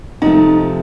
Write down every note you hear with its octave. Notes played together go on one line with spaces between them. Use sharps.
C3 F3 A3 D#4